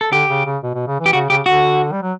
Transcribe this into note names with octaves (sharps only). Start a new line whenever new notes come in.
A4
D3 G4
C#3
C#3
B2
B2
C#3
E3
G4
C#3 F#4
C#3 G4
D3 F#4
G3
F#3